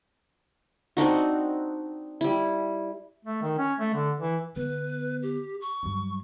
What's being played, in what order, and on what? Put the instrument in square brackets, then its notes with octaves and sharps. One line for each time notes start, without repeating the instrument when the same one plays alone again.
[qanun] C4 D4 D#4 F#4
G3 E4
[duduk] A3
D#3
C#4
A3
D3
E3
[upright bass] D3 B3 [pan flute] B4
[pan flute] G4
C#6
[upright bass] G2 F#3